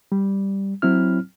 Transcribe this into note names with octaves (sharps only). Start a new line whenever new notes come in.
G3
F#3 C4 E4 F6